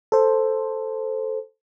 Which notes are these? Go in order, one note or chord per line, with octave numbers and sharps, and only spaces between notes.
A4 C5